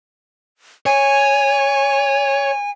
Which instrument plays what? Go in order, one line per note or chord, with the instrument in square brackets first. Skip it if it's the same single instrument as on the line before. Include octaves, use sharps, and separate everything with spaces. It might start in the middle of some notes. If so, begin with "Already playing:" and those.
[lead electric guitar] C#5 [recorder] G#5